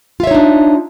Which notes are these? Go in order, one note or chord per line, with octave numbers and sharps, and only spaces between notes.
D4 D#4 F4 C#5 E5